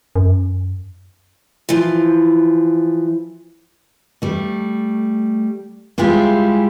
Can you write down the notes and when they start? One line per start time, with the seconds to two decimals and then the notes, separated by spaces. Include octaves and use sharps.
0.16 F#2
1.69 E3 F3
4.22 G3 A3
5.98 G3 G#3 E4 F4 G4 G#4